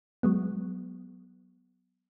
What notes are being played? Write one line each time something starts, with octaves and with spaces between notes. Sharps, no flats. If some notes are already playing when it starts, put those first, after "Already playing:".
F#3 G#3 B3